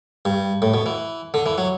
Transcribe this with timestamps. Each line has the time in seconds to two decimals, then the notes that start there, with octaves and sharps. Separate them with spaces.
0.25 G2
0.62 A2
0.74 B2
0.86 E3
1.34 D3
1.46 E3
1.58 F#3